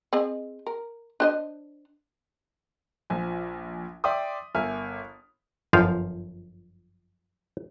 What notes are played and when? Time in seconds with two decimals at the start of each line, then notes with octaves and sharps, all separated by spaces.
0.13 C4 G#4 D#5
0.67 A#4
1.20 D4 C5 D#5
3.10 A#1 F3 G#5
4.04 D5 E5 G5 C6 D6 D#6
4.55 G1 A#4 E5 G#5 F6
5.73 G1 F#2 F3 F5